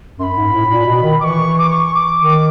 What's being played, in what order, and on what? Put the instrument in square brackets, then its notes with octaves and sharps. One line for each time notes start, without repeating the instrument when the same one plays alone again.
[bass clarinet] F#2 [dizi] C6
[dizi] B5
[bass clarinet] G#2
A2
A2
A#2
B2
D#3
[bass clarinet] E3 [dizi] D6
[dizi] C#6
D6
C#6
D6
[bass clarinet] D#3 [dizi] D6